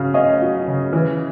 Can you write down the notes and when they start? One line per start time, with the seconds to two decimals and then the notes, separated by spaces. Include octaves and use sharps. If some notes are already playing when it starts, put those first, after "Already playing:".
Already playing: C#3 F#3 F5
0.14 C#4 D#5 F5
0.41 F#3
0.67 C#3
0.93 E3